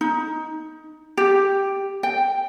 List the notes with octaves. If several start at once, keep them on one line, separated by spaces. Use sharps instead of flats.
D#4
G4
G5